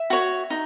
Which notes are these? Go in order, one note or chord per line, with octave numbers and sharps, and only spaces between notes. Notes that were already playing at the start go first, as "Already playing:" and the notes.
Already playing: E5
F#4 C#5
D#4